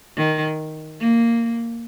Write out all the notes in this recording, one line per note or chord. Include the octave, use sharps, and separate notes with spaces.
D#3
A#3